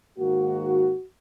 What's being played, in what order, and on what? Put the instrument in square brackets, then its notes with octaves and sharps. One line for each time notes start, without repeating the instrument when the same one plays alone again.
[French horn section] G#2 D#3 A#3 F#4